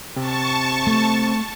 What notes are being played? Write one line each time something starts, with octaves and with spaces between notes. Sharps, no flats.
C3 A5 C#6
A3